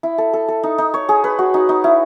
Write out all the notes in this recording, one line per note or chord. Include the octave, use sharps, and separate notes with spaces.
E4
A4
A4
A4
D#4
D#4
C#5
G#4
B4
F#4
D#4
D#4
E4